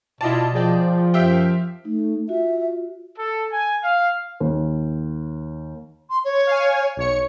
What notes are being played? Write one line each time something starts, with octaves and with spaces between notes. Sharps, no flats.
B2 E4 F4 D5 D#5 A5
F3 G#4 D5 G5
F#2 F4 G4 E5 G5
A3 D#4
F4 F#4 E5
A4
G#5
F5
D#2
C6
C#5
F5 G#5
B1 C#5 C#7